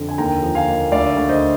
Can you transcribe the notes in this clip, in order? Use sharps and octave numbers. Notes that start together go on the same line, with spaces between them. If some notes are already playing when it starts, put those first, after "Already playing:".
Already playing: F2 D3
G#5
D#2 G5 A#5
F3
F5 G#5
D#2
D2 D5 F5
D2
C5 D#5